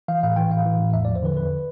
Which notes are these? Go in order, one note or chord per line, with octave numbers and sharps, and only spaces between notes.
E3 F5
A2 F5
E3 G5
A2 F5
E3
A2
E2 E5
F3 D5
C5
D3 B4
E2 B4